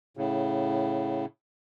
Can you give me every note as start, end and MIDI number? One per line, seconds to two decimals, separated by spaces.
0.17 1.25 45
0.17 1.25 49